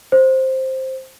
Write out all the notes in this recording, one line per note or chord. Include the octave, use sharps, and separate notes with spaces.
C5